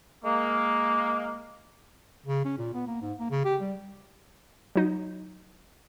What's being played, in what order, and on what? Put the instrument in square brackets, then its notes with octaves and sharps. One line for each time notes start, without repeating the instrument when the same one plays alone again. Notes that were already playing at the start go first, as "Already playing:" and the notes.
[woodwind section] G#3 A#3
[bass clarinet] C#3
C#4
A#2
B3
A#3
G#2
A#3
C#3
G4
G3
[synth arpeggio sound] F#3 D#4